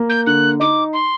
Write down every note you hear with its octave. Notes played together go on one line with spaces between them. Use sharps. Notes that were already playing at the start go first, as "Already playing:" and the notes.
Already playing: A#3
G6
D3 F#6
D#4 D6
C6